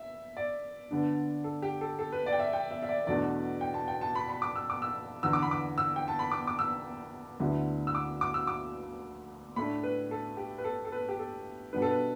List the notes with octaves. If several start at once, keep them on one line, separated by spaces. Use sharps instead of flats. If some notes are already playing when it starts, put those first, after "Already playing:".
Already playing: E5
D5
D3 B3 D4
A4
G4
A4
A4
B4
D5
G5
E5
G5
E5
E5
D5
E2 B2 A3 D4 D5
G5
A5
G5
A5
B5
B5
D6
E6
D6
E6
E2 D3 B3 E6
D6
B5
D6
E6
G5
A5
B5
D6
D6
E6
D2 D3 B3 E4
E6
D6
D6
E6
D6
A2 A3 D4 B5
B4
A4
G4
B4
A4
A4
B4
G4
A4
B2 G3 B3 D4 B4
A4
B4